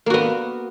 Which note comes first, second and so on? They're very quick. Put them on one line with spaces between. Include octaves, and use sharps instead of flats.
A#3 F#4 B3